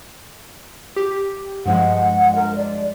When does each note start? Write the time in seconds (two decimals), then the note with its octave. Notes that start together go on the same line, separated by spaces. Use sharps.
0.96 G4
1.66 G2 F3 G#3 F#5
2.35 A#4
2.56 D5